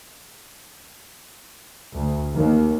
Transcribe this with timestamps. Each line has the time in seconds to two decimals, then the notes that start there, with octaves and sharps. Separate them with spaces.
1.94 D2
2.36 D#2